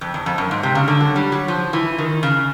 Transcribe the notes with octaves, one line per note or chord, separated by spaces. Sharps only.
F2
E2
F2
F#2
G#2
C3
C#3
D3
F#3
G3
F#3
F3
E3
D#3
C#3